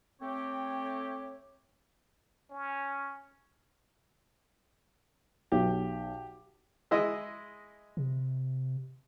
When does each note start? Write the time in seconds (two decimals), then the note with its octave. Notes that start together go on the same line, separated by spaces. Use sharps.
0.21 A3 C4 G4 C#5
2.50 C#4
5.52 B1 G4
6.91 G#3 E4 D#5
7.97 C3